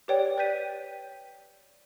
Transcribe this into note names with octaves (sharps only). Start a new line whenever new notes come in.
G4 B4 C#5 D5 G5
B4 D5 G5 G6 B6 D#7